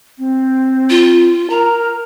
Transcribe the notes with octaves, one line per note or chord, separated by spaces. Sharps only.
C4
F4
A#4 A#5